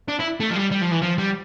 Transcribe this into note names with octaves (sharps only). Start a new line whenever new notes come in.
D4
E4
A3
F3
G3
G3
F3
E3
F3
G3